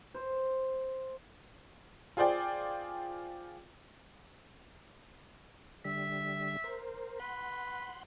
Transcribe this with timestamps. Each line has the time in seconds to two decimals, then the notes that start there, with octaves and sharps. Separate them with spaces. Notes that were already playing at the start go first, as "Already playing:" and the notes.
0.14 C5
2.17 F4 G#4 C5 D5 G5
5.85 D3 G3 E5
6.64 A#4 C5
7.20 B4 F#5 C6